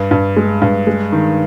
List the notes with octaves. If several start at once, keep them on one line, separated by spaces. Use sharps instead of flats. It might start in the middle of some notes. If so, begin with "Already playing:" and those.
Already playing: G2
G2
G#3
G2
G#3
D#3